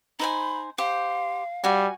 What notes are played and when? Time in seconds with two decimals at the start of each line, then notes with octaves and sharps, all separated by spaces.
0.19 D#4 C5 G#5 B5
0.78 G4 C5 F5
1.64 G3 F#4 G#5